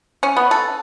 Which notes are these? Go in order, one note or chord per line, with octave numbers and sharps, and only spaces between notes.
C#4
B3
A4